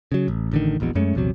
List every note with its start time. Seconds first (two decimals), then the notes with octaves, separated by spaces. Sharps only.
0.12 C#3 F#3
0.28 A1
0.51 A1 D3 D#3
0.80 E1 A#1 E2 B2
0.95 F#2 G#3 A3 C#4
1.15 A#1 E2 C3 F#3